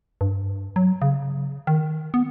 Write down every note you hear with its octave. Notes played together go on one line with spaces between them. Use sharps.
G2
F#3
C#3
D#3
B3